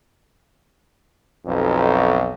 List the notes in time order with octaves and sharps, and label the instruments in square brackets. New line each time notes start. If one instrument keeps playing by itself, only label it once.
[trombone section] B1 F2